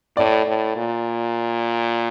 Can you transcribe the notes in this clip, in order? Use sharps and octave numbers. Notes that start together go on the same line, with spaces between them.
A2 D5
A2
A#2